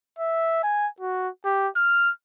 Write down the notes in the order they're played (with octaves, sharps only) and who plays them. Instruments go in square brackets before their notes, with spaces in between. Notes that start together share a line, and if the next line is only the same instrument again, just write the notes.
[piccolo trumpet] E5
G#5
F#4
G4
F6